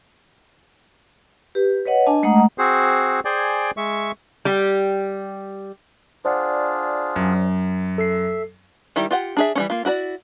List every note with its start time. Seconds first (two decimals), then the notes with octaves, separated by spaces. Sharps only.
1.55 G4 B4
1.85 B4 C#5 D#5 F#5
2.06 D4 D#5 G#5 A5
2.23 G#3 A3 D#5 F#5 A#5 D#6
2.58 C4 F#4 G#4 C5
3.25 G#4 C5 D5 G5 G#5
3.77 G#3 E5 C#6
4.45 G3 G4
6.25 D4 F4 G#4 C5 D5 F#5
7.16 F#2
7.98 A4 E5 C7
8.96 D#3 G3 E4 G4
9.11 F4 G4 F#5
9.37 D4 G#4 E5
9.55 E3 G3 C#4
9.70 A#3 F4
9.85 E4 F#4 A#4 D5